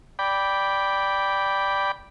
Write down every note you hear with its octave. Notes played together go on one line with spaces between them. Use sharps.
D5 G5 B5